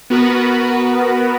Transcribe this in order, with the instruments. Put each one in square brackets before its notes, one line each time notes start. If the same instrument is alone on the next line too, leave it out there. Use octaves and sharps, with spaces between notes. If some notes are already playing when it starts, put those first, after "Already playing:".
[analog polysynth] B3 F#4 A#4 B4